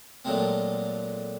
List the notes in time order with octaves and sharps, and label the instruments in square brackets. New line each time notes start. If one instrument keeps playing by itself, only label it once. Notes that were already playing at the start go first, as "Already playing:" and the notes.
[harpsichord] A#2 F3 F#3 G#3 A3 C4